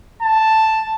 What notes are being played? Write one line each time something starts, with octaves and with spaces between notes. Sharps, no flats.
A5